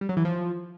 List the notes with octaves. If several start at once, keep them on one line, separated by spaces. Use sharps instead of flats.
G3
F#3
E3
F3